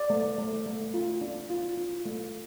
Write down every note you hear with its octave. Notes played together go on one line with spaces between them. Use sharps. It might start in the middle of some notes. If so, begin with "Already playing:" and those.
Already playing: D5
A3
A3
A3
F4
D4
F4
F4
A3